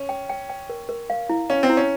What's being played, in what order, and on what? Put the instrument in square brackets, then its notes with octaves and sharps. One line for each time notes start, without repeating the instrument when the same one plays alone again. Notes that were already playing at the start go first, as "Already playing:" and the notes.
Already playing: [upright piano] C#4
[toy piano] G5
G5
G5
A#4
A#4
F5
E4
[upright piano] C#4 [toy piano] F5
[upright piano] C4
[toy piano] E4
[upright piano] C#4